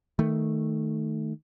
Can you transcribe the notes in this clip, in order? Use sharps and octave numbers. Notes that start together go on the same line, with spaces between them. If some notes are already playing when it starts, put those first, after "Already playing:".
D#3 A3